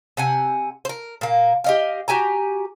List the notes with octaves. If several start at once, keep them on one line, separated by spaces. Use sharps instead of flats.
C3 F#5 G#5
A#4 C5
A#2 A#3
G4 D#5 F5
F#4 G4 G#5 A#5